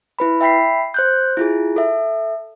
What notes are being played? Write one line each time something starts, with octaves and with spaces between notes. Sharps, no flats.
E4 B4 B5
E5 G5 B5 B6 C7
C5 F#6 G6
E4 F4 G#4
A4 E5